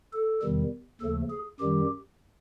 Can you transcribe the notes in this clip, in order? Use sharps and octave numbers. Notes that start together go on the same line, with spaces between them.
A4
E2 C3 D#3 G3
D#2 C#3 F3 A3 A4
G#4
F#2 D#3 G3 G4